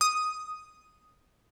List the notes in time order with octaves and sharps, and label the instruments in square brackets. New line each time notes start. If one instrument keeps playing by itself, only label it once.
[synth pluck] D#6